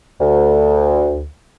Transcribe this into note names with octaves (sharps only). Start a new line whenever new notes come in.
D2